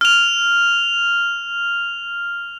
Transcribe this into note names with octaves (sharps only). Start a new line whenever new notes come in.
F6 F7